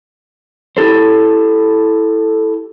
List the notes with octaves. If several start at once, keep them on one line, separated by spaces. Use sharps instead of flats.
E4 G4 A4 C5